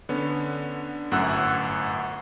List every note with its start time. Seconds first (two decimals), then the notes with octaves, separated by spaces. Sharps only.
0.09 D3 B3 C#4
1.11 G1 F#2 A2 F#5 E6 F#6